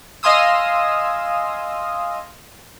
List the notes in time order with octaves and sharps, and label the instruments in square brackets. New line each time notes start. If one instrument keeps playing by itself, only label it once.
[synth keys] D#5 F5 G#5 C6 D#6 E6